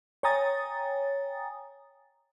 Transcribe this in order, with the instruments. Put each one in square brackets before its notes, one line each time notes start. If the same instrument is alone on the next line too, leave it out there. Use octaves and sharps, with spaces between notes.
[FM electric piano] C#5 G5 G#5 A#5 D#6 A6